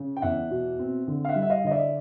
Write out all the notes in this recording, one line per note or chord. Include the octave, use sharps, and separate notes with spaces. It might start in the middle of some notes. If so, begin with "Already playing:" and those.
Already playing: C#3
G5
E2 E5 F#5
B2
C4
D3
F5
E5 F#5
G3
E5
D#5 F5
D3 D#5
D5 E5